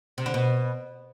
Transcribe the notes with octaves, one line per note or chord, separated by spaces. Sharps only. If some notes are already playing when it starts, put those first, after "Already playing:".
C3
D3
B2